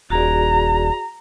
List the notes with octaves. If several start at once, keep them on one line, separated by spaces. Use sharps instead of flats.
D#1 F#4 G#4 D5 A#5